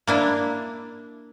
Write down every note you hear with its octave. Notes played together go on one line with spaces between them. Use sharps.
A#3 D4 E4